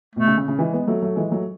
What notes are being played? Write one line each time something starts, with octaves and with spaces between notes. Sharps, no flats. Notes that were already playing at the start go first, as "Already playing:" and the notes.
B2 A3
C#3
C#3
C#3
E3 G#3
G#3 B3
F#3 A3
F#3 A3
E3 G#3
F#3 A3